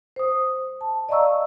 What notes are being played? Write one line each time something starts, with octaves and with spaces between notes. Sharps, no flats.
C5 D#6
A5
D5 D#5 F5 A#5 C#6 E6